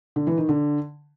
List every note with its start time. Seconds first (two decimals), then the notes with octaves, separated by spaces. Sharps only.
0.16 D3
0.27 E3
0.38 D#3
0.49 D3